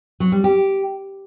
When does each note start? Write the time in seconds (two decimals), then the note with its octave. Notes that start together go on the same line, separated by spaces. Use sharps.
0.20 F#3
0.32 G3
0.44 G4